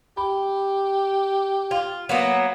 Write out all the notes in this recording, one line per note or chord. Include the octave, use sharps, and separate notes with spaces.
G4 B5
F4 F5
F#3 A#3 B3